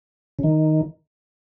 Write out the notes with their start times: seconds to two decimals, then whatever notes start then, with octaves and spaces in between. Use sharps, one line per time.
0.39 C#3
0.43 D#3